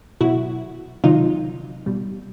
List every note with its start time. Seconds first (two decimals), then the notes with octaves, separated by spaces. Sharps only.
0.21 B2 F#3 E4 F#4
1.04 C3 D#3 F#3 D#4 F4
1.86 B2 G3